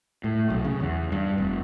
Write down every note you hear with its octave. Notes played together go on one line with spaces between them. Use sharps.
A2
B1
C#3
E2
G2
F1